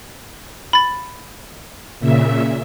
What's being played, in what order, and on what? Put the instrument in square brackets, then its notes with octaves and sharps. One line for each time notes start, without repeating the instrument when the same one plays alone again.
[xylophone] B5 A6
[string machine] A#2 C#3 E5